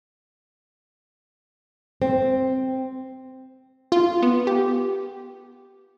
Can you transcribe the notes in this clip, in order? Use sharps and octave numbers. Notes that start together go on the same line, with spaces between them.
C4
F4
B3
G4